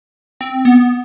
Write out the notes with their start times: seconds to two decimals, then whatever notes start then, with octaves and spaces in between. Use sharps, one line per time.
0.41 C4
0.65 B3